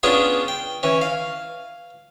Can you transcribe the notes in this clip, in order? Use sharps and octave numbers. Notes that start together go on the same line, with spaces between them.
B3 C#4 D4 F4 G#4
G5
E3 C#4
F5